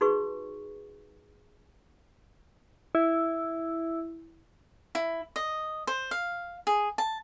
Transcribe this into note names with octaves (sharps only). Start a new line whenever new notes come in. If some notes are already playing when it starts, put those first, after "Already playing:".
D#4 F#4 G#4 B4 C#6
E4
E4
D#5
C5
F5
G#4
A5